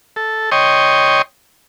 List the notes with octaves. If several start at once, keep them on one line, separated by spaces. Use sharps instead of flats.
A4
C#5 D#5 G5 C6 C#6 D#6